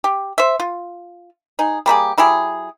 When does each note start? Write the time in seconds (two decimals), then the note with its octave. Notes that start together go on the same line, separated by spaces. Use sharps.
0.04 G4
0.38 C5 E5
0.60 F4
1.59 D#4 G#4
1.86 G3 A#3 G4 G#4
2.18 F#3 E4 G4 G#4